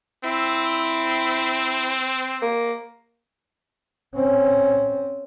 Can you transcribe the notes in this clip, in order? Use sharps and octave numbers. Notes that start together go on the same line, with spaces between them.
C4 E4
A#3
C4 C#4